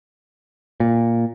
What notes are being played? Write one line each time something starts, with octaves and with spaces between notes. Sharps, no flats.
A#2